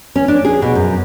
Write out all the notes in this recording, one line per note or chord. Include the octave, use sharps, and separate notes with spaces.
C#4
D4
G#4
B2
F#2